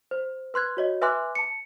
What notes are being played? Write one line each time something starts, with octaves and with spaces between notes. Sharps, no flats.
C5
B4 C6 F#6 G#6
F#4 C#5 D#5
B4 E5 G#5 C6 D6 F#6
A5 C#7